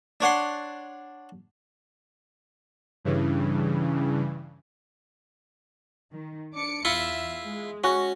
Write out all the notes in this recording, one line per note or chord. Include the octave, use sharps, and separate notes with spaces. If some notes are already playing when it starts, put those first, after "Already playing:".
D4 C#5 F#5 C6
G2 C#3 E3
D#3
D4 D6 C#7
E2 E4 F4 E5
G#3
C#4 F#4